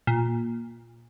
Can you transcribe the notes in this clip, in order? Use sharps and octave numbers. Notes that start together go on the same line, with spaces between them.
A#2